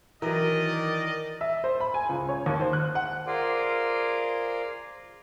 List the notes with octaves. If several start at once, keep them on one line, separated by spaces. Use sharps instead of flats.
D#3 E3 F#3 A#4 D5 D#5
E5
C5
B5
G#5
C#2
C#5
D#2
C5
F#6
F#5
F4 G#4 A#4 C5 D5